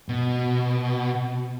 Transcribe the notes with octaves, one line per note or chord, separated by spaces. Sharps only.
B2